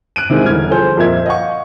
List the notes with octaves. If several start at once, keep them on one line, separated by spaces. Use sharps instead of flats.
F#6 D7 D#7
C3 D#3 G#3 E4
E1 D3 E3 G3 F6 G#6
F3 G#4 A4 C5 G6
F2 A#2 A#4 D#5 E5 G#6
D#5 F5 F#5 C#6